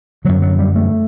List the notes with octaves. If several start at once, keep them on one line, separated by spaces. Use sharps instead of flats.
F#2 D3 F#3
F#3
G3
A3